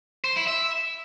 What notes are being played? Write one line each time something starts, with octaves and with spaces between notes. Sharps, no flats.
C5
E4
E5